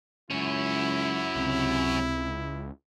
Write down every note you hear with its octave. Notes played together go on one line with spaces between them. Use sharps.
C#2 F#2 C#4 E4
C#2 C3